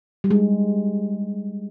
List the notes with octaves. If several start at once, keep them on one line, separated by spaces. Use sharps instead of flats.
G3
G#3